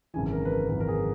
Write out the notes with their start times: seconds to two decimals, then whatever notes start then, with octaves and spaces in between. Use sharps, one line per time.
0.14 G#1 F#2 C#3 E3 G#5
0.32 A#4
0.45 B4
0.51 A#4
0.69 G#1 F#2 C#3 E3 A#4
0.81 A#4
0.88 G#4